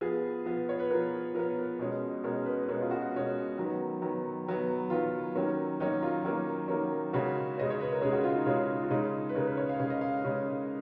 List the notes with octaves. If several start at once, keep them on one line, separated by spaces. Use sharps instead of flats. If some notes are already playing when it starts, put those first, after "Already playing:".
F3 B3 G#4
F3 B3
C#5
B4
F3 B3 A#4
F3 B3 A#4
B2 G#3 C#4
B2 G#3 C#4 A#4
B4
B4
B2 G#3 C#4 A#4
F4
F#4
B2 G#3 C#4
D#3 F#3 B3
D#3 F#3 B3
D#3 F#3 B3
D#3 F#3 B3 F4
D#3 F#3 A#3 C#4
D#3 F#3 A#3 C#4 D#4
F4
D#3 F#3 A#3 C#4
D#3 F#3 A#3 C#4
C#3 G#3 C#4 F#4
C#3 G#3 C#4 D#5
C#5
B4
A#4
C#3 G#3 C#4 G#4
F#4
F4
D#4
C#3 G#3 C#4 F4
F4
C#3 G#3 C#4 D#4
B4
C#3 G#3 C#4 A#4
B4
C#5
F5
C#3 G#3 C#4 F5
D#5
F5
C#3 G#3 C#4